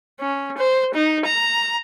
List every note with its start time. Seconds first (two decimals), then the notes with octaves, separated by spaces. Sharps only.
0.21 C#4
0.58 C5
0.94 D#4
1.26 A#5